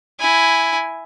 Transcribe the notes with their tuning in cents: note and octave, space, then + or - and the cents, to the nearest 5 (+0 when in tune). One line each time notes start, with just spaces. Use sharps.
E4 +0 G#5 +0